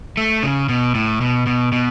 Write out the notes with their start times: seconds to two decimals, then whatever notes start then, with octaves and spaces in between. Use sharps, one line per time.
0.17 A3
0.43 C#3
0.69 B2
0.95 A2
1.21 B2
1.47 B2
1.72 B2